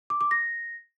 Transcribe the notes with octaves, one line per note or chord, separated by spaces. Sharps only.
D6
D6
A#6